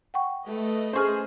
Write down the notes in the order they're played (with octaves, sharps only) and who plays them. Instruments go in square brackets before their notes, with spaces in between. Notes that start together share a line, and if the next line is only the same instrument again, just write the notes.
[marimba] F#5 G5 C#6
[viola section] A3 B4 D#5
[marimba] C#4 C#6 F6 [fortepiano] G#4 C5